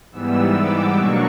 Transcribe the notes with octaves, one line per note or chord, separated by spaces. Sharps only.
G#2 E3 G3 B3 E6
D6
B2 F#3 A#3 D4 C#6